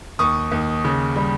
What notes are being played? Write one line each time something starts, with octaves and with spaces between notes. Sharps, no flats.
D#2 C#6 D#6
D#2
C#3
G3